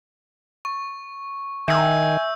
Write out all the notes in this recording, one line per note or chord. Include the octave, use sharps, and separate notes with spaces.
C#6
D#3 E5 G#5 E6 G6